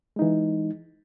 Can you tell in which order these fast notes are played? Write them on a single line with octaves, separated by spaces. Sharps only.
G#3 D#4 E3